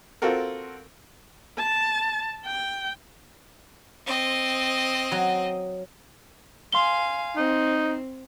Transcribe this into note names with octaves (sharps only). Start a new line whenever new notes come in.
C4 F4 F#4 A4 A#4
A5
G5
C4 D#5
F#3
F5 G#5 C6 G7
C4 D#4